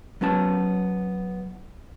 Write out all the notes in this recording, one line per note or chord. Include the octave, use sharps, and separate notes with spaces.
F#3 B3 C#4 A5